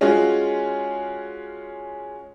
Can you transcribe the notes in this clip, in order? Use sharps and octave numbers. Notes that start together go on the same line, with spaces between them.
G#3 C#4 F4 F#4 G#4